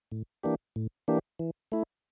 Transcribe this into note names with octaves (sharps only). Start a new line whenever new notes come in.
A2
E3 A#3 D4 G4
A2
E3 A#3 D4 G4
E3
A3 E4